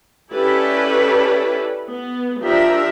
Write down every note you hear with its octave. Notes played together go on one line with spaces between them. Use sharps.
C#4 E4 G4 A4 B4 D5
B3
F3 D4 G4 A#4 E5